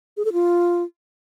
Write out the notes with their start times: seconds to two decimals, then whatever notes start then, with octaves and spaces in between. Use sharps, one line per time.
0.17 G#4
0.25 A4
0.33 F4